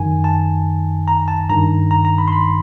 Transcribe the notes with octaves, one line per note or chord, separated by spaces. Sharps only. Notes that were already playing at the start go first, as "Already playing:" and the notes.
Already playing: F#2 D#3 G#5
A5
A#5
A5
G2 D#3 A#5
A#5
A#5
B5
C6
B5